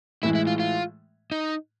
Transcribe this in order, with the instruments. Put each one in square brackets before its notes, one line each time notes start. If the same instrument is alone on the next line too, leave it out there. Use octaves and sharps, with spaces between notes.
[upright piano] A2 E3 G#3 [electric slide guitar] E4
[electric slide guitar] E4
F4
F4
D#4